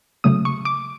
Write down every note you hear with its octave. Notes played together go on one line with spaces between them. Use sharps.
C#3 F#3 A3 D#6
C#6
D6